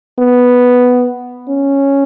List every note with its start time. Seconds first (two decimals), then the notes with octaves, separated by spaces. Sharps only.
0.19 B3
1.49 C#4